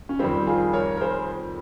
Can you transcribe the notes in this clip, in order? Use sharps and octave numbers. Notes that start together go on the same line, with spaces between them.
C#4
F2 D#3 G3 C4
F4 G#4
A#4 C#5
A#4
G#4 C5